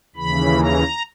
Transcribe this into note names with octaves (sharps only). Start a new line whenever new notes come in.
D#2 C#3 E3 B5
A#5